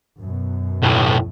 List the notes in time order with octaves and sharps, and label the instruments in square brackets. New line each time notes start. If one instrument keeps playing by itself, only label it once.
[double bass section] F#2 B2
[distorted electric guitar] B1 A2